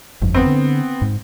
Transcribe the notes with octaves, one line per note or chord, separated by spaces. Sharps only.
G1 F2
B3 C4
D3
G#2